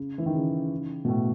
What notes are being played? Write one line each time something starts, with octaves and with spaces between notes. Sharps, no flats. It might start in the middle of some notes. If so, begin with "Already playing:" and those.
Already playing: C#3
E3
D#3
C#3
B2
A2